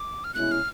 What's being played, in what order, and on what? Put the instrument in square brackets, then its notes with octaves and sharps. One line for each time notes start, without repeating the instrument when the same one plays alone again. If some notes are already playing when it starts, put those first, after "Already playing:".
Already playing: [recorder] D6
F6
[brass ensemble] C2 B2 G#3 C#4 E4 [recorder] F#6
[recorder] F6